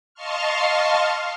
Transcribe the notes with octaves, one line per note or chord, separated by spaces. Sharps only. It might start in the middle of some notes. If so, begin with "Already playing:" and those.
D#5 F5 A5 C6 C#6 F6